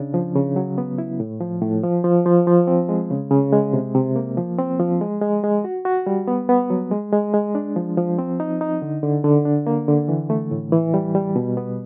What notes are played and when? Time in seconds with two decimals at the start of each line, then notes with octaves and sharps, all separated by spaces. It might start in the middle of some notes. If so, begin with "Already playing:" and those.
Already playing: C#3 D4
0.14 F3
0.35 C#3
0.56 F#3
0.78 B3
0.98 E4
1.20 A2
1.41 F3
1.61 A2
1.84 F3
2.04 F3
2.26 F3
2.47 F3
2.67 C4
2.89 G#3
3.11 C#3
3.31 C#3
3.52 G#3
3.73 C3
3.95 C3
4.16 A#3
4.37 F3
4.58 C4
4.79 F3
5.01 G#3
5.22 G#3
5.43 G#3
5.64 F#4
5.85 F#4
6.07 G3
6.28 B3
6.49 B3
6.70 F#3
6.91 G#3
7.12 G#3
7.34 G#3
7.55 D4
7.76 F3
7.97 F3
8.18 C4
8.40 D#4
8.61 D#4
8.82 D3
9.03 D3
9.24 D3
9.45 D4
9.67 A#3
9.88 D3
10.08 E3
10.30 A3
10.51 A2
10.72 E3
10.94 G3
11.15 G3
11.36 B2
11.57 B3